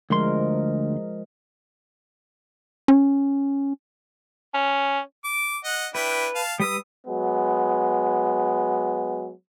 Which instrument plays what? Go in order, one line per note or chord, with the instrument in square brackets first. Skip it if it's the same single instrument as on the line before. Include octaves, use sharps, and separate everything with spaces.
[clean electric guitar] D2 C6 [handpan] F3 G#3 A#4
[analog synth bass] C#4
[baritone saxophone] C#4
[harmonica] D6
D#5 F#5
[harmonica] D4 E4 G5 [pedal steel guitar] B4
[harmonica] F5 A5
[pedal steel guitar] G3 B4 E6 [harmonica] D#6
[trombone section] F#3 G#3 B3